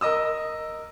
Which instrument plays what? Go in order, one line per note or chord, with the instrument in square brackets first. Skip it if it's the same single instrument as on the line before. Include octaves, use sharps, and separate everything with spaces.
[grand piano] A#4 D#5 D#6 E6